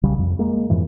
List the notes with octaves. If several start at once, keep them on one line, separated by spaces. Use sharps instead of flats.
B1 C#3 G3
F2
G#3 A#3
F2 G#2 E3